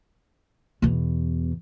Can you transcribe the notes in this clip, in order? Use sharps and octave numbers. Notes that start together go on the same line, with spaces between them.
E2 B2